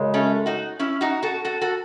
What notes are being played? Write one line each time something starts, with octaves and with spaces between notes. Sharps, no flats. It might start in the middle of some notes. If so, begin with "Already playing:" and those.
Already playing: F#2 C#3 G#3
A3 C#4
D#4 F#4
C#4 E4
D#4 F#4
F#4 A4
F#4 A4
F#4 A4